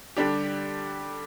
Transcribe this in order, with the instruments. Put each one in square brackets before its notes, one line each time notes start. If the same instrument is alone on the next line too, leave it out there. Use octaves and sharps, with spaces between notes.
[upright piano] D3 G3 D4 G4